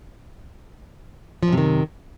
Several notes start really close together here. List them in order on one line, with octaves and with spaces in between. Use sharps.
F3 F#2 C3 D#3